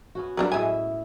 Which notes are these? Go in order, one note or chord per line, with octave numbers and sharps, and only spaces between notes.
B3 C#4 F#4
F#3 G3 D4 A#4 B4
A2 G#3 E4 E5 G#5